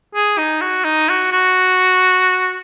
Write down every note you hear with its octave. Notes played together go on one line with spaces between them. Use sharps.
G#4
D#4
F#4
D#4
F#4
F#4